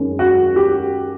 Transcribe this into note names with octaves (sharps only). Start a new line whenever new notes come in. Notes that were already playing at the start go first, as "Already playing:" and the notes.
Already playing: F#2 D#3 G#3 C#4
F#4
G4